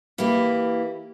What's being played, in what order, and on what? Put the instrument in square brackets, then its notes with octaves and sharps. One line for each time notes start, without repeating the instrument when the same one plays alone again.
[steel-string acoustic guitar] E3 A#3 E4 G4